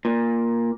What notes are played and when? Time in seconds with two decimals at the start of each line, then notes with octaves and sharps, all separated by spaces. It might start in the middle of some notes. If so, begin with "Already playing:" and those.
0.05 A#2